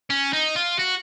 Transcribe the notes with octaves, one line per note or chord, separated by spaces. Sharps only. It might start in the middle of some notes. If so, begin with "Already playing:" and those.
C#4
D#4
F4
F#4